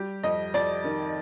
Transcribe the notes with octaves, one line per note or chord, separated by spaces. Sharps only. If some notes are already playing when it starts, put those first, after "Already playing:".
Already playing: G3 G4
F2 D#5
F2 D5
D#3